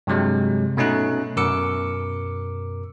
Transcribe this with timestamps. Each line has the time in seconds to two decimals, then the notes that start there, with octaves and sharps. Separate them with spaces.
0.07 G2 C3 F#3 G#3
0.77 B2 A3 C#4 D#4 F#6
1.36 F#2 B2 A#4 D6 E6 C#7